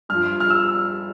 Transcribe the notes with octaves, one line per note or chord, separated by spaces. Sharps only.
G2 F3 F6
F6
E6